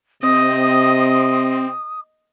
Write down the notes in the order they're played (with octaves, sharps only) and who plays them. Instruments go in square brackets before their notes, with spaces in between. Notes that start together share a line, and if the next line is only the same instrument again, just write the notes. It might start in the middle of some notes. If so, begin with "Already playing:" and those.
[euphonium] C3 [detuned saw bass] C4 [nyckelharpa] D#5 [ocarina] D#6